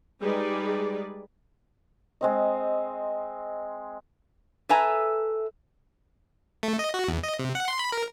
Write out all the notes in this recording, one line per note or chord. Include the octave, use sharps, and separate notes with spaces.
G3 G#3 D#4 G#4 B4 D5
G#3 C4 D#5
A4 B4 E5 G#5 A#5
A3
D#5
F#4
E2
D#5
C3
F#5
C6
B5
A#4